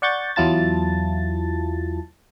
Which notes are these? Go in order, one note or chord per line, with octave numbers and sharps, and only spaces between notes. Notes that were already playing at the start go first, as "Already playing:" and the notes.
D5 F#5 C#6 G6 A6
E2 F#3 E4 F4 A5 A6